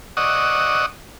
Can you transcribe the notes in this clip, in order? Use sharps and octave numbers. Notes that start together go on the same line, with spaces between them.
D5 D#5 F#5 C#6 D#6 E6